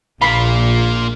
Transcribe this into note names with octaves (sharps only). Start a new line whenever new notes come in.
A#1 A#3 F4 B5 C7